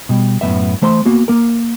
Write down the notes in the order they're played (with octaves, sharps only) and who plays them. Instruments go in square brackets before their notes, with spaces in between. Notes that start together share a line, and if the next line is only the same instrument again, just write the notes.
[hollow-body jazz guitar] B2 G3
F#2 A2 F3 B3 E5
E3 A3 C5 B5 C6
A#3 B3 F#4
A#3 A#4